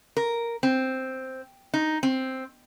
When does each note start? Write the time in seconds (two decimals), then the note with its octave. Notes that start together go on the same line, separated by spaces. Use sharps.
0.17 A#4
0.63 C4
1.74 D#4
2.03 C4